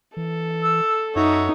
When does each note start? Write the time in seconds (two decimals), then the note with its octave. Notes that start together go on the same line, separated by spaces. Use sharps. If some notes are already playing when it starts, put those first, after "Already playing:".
0.17 E3 A4
0.63 E6
1.16 F#2 D#4 F#4 C#5 E5